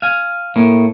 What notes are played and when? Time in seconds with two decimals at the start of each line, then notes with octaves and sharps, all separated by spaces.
0.02 F5 G#5
0.56 A2 A#3